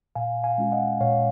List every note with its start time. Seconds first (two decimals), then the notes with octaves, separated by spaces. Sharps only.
0.15 A#2 F5 G#5
0.44 F5 G#5
0.58 G#3 C#4 F4
0.72 D#5 F#5
1.01 A#2 C#5 F5